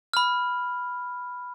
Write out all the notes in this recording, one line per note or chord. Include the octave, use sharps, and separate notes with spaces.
B5 F6